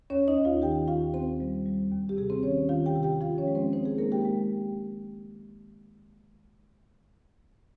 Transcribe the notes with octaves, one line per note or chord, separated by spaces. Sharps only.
D#2 C#4 C#5
D#4 D#5
D#2
F4 F5
D#3 G4 G5
D#2 F4 F5
D#2 C4 C5
G3
G3
D#2
G4
C3 G#4
C4 C5
D#3 C#4 C#5
D#3 F4 F5
G4 G5
C3
G4 G5
F3 F4 F5
C#4 C#5
G#3
C4 C5
C4 D#4 C5
G#4
G#3 A#3 A#4
G4 G5
G#3